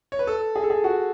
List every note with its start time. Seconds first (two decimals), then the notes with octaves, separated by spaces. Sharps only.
0.12 C#5
0.19 B4
0.27 A4
0.56 G#4
0.64 A4
0.70 G#4
0.84 F#4